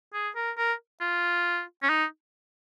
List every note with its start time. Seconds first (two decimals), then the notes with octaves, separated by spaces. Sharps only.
0.14 G#4
0.36 A#4
0.58 A#4
1.01 F4
1.83 C#4
1.90 D#4